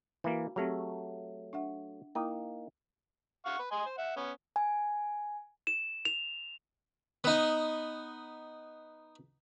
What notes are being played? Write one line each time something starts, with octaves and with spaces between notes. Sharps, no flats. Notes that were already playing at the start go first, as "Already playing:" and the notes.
E3 A#3 F#4 F5
F#3 A3 C4 G4 G#4
D4 E5 F#5
A#3 D#4 E4 G5
F5 F#5 C#6
B4
D#5 G#5 C6
C5
E5 F#5
B3 C#4
G#5
E7
F7
B3 D#4